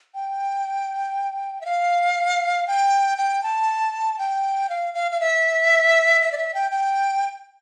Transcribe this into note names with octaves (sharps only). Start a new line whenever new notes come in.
G5
E5
F5
G5
G5
A5
G5
F5
F5
F5
E5
E5
D5
E5
G5
G5